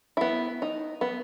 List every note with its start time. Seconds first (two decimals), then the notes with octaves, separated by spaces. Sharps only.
0.17 B3 E4
0.62 D#4
1.01 B3